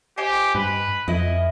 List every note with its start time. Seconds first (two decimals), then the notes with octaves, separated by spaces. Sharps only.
0.18 G4 C5 D#5 G#5
0.55 G2 B4
1.08 F2 E4 D#5